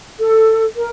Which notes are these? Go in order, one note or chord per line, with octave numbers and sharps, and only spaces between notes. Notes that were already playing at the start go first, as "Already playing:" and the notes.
A4
A#4